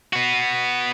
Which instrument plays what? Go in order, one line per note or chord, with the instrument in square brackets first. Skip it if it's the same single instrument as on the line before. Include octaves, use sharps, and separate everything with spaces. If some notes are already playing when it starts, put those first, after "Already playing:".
[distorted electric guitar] B3 F#4